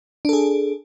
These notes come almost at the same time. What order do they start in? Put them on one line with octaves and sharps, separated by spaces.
D4 A4 G#4